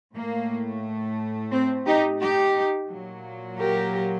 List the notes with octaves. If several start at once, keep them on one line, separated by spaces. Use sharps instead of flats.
A2 A3 A#3
C4
D#4 G4
D#4 G4
A#2 F#3 A#3
G4 A#4